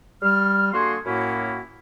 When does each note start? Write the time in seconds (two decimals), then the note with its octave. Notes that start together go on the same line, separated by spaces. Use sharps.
0.22 G3 F6
0.74 D3 A#3 F#4 G#4 C6
1.06 F#2 A2 A#3 C#4 E4 F#4